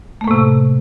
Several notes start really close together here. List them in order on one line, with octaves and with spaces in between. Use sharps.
A3 A#3 A2 C3